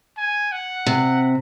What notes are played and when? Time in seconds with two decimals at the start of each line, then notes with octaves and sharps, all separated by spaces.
0.18 G#5
0.52 F#5
0.86 C3